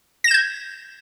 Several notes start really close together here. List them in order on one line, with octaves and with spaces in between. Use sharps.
A#6 E7 G6 G#6